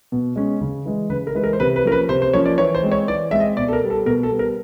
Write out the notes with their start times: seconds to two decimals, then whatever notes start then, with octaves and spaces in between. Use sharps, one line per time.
0.12 B2
0.36 G#3 C#4
0.61 C#3
0.85 E3 G#3
1.10 C#3 B4
1.27 A#4
1.35 E3 G#3 B4
1.44 A#4
1.53 C5
1.60 C3 B4
1.76 B4
1.84 F3 A#3 C#4 A#4
1.92 B4
2.09 C3 C5
2.22 C5
2.33 F3 A#3 C#4 C#5
2.46 D5
2.58 E3 C#5
2.75 C5
2.83 G#3 C4
2.92 C#5
3.08 E3 D5
3.31 G#3 C4 E5
3.40 D#5
3.57 B2 D5
3.68 A4
3.73 A#4
3.81 G3 B3
3.90 A4
4.06 B2 A#4
4.23 A4
4.31 G3 B3
4.39 A#4